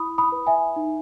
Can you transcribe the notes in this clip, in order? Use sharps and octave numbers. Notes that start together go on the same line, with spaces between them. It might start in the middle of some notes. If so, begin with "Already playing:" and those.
Already playing: E4 B5 D#6
B5 D#6
B4
E5 G#5
D#4